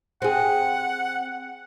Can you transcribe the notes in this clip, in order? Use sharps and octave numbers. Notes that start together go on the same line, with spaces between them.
C4 G#4 F#5